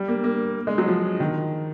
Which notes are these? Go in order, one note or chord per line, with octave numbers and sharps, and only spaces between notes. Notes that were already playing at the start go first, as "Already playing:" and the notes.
Already playing: G3
A#3
A#3
G#3
F#3
F3
D#3